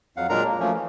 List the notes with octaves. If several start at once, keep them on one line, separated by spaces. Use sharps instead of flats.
F2 F#3 F5 F#5
A#2 F#3 G#3 D4 A#4 A#5
A#3
F3 F#3 A3 A#3 C#4
E3